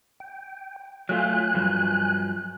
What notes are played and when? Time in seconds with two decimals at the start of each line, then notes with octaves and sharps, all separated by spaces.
0.20 G5
1.09 F#3 A3 F4 G#5 F#6
1.55 G2 F3 F#3